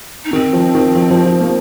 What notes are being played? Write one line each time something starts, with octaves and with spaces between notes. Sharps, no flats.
D#4
D#3 C4
F3
D#3
F3
F3
F3
A#3